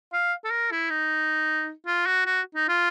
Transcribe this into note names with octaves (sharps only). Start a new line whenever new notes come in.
F5
A4
A#4
E4
D#4
F4
F#4
F#4
D#4
F4